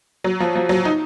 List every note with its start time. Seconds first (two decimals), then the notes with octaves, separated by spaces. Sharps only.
0.24 F#3
0.40 F3
0.55 F3
0.69 F#3
0.85 D#4